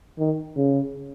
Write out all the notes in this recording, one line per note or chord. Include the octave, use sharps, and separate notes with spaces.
D#3
C#3